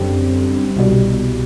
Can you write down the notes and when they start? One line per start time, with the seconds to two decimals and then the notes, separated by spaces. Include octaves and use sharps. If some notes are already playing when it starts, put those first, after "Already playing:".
Already playing: F#2 D3 G3 C4
0.76 C2 B2 G3